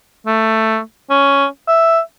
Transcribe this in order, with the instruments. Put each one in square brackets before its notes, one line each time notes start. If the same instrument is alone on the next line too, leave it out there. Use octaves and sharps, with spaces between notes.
[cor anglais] A3
C#4
E5